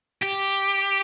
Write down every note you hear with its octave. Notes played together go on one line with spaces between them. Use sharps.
G4